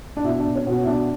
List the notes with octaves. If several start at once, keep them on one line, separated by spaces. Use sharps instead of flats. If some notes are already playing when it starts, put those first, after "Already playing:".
D4
B2 E4
D4
B2
C#4
B2 F#4
E4
B2 D4